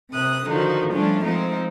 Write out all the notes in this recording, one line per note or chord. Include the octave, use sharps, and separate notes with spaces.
C3 D#6 F#6
D3 D#3 F3 D#4 F#4
F3 G3 A3 C#4 D4 F4
F3 G#3 C4 D#4 F4